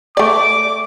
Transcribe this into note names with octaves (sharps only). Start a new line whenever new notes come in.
A3 D5 D6